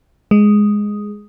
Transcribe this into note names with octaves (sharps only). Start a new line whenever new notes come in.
G#3